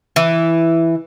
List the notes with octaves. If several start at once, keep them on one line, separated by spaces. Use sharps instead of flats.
E3